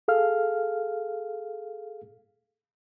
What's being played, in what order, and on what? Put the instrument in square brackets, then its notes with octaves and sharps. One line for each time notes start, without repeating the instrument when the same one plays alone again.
[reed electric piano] G#4 A4 F5 F6